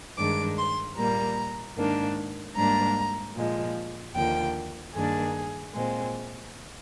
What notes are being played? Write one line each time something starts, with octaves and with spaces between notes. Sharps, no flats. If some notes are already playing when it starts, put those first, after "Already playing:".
G2 D#3 G#3 D4 D6
C6
A#2 G3 A#3 A#5
G#2 D#3 A#3 D4
G#2 G3 A#3 D4 A#5
A#2 F3 G#3
D#2 D3 F3 A#3 G5
G2 D#3 A#3 D4 G#4
A#2 G#3 C4